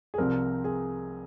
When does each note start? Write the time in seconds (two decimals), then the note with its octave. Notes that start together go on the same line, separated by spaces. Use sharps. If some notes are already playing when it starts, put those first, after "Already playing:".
0.14 G#4
0.18 C2 C3 F3 C4 A#4
0.64 G#4